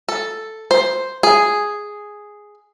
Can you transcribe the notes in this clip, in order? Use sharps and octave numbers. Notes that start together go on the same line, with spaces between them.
A4
C5
G#4